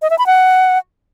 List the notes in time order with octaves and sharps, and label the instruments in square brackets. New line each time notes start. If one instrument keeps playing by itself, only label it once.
[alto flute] D#5
E5
B5
F#5